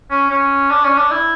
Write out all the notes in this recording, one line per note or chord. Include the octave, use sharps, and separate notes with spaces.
C#4
C#4
D4
C#4
D4
E4